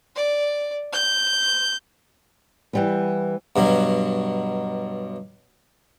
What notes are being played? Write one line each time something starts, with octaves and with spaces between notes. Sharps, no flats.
D5
G6
E3 G3 B3
G2 B2 F#3